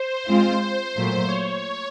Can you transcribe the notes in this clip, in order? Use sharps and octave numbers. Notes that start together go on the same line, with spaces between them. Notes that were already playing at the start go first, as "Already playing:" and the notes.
Already playing: C5
G#3 C4 F4
C5
A#2 F#3 A3
C#5